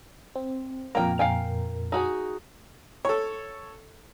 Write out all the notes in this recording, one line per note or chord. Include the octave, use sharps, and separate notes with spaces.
C4
F2 A#2 A#3 A#4 G5
F5 G5 G#5
D#4 F#4 G#4
A4 C#5